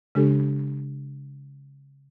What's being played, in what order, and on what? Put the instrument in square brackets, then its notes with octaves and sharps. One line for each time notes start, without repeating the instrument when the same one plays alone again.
[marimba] C#3 G#3 D4 G4 A4